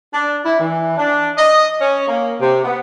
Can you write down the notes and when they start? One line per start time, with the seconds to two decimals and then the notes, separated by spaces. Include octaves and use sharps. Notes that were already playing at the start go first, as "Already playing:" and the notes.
0.13 D4
0.45 E4
0.60 E3
0.97 D4
1.37 D#5
1.81 C#4
2.08 A#3
2.41 C3
2.64 B3